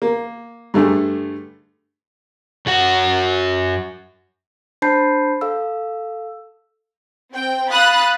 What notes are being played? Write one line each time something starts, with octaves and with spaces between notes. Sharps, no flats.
A#3
G2 D3 A3 G#4
F#2 F#4 F#5
D4 C5 A5 B5 G6 C7
A4 F5 E6
C4 G5
F5 B5 D#6 F#6 A6